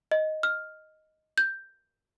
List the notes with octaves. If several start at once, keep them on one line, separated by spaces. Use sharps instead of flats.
D#5
F6
G6